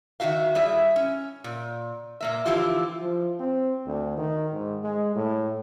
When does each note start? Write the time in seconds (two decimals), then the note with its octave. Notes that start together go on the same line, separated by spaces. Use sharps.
0.20 D#3 F3 F#4 E5 F5
0.55 G3 E4 G#4 E5
0.96 C#4
1.44 A#2
2.21 A#2 A#3 E5
2.45 D3 E3 F3 E4 F4 G4
3.02 F3
3.40 C4
3.86 D2
4.18 D#3
4.53 G#2
4.84 G#3
5.16 A2